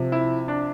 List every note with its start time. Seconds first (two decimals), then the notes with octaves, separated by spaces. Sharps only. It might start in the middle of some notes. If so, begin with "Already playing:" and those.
Already playing: C3 F3
0.12 E4
0.48 D4